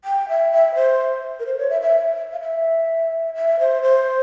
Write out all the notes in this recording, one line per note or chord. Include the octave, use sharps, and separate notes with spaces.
G5
E5
E5
C5
A#4
C5
C#5
E5
E5
F5
E5
E5
C5
C5